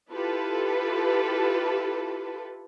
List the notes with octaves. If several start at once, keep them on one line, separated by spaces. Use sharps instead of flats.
E4 F4 G4 A4 B4